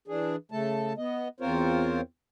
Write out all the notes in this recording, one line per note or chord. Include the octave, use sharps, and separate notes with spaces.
E3 D4 G#4
C#3 A3 A4 A5
B3 D#5
E2 C4 F4 A#4 C5 C#5